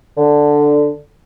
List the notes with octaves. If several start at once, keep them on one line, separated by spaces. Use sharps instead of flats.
D3